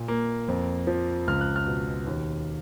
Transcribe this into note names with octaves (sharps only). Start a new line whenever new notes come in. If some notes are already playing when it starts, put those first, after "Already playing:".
Already playing: A#2
A#3
F2
F3
C#2 F6
F#6
F6
B2
D#2